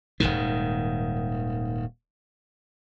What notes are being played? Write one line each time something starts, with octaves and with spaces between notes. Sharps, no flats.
D#1 B1 G#2 D#3